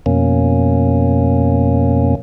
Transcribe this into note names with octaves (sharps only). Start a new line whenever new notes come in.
F2 B2 A#3 C#4